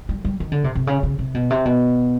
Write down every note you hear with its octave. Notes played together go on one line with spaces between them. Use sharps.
G3
G3
D#3
D3
C3
C3
C#3
C#3
C3
B2
C3
B2